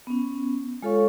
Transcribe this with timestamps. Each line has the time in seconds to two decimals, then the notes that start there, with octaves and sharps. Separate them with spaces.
0.07 B3 C#4
0.82 G#3 F4 A4 C#5 F5 C#6